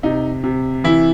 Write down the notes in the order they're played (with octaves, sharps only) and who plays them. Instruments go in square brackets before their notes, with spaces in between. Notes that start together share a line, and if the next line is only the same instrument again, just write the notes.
[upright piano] C3 D#4
C3
E3 E4